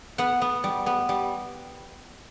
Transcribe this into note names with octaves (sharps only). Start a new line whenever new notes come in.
B3 F#5
B3
G3
B3
G3